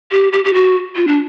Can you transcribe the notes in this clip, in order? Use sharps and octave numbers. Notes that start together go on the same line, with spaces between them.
G4
G4
G4
F#4
F4
D4